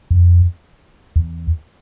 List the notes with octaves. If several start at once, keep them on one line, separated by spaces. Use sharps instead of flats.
F2
E2